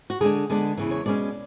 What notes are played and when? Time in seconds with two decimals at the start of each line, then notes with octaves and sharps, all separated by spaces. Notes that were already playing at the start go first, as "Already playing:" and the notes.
0.10 F#4
0.21 D3 G#3 D4 G#4
0.50 D3 G#3 B3 D4
0.77 E2 C#3 E3
0.91 C#5
1.06 B2 G#3 C#4 D5